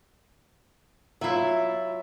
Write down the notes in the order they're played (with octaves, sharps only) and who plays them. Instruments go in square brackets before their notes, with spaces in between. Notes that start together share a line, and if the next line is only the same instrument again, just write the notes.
[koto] F#3 E4 [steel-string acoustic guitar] F4 E5